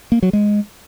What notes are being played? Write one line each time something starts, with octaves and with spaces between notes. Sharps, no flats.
A#3
F#3
G#3